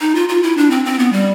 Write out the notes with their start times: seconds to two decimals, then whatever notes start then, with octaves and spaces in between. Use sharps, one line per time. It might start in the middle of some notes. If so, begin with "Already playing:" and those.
0.01 D#4
0.15 F4
0.29 F4
0.43 E4
0.57 D4
0.71 C4
0.85 C4
0.99 B3
1.13 G3